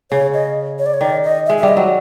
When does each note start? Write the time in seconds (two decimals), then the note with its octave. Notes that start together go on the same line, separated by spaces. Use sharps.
0.11 C#3 C#5
0.34 D#5
0.79 C#5
0.86 D5
0.94 C#5
1.01 D#3 D5
1.24 D#5
1.46 E5
1.49 G#3
1.58 E5
1.63 G3
1.68 D#5
1.77 F#3